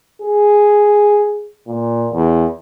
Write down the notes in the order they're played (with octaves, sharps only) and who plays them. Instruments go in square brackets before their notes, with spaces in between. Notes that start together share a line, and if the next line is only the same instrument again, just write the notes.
[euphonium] G#4
A#2
E2